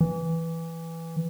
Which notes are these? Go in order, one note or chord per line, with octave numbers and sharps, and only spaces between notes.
E3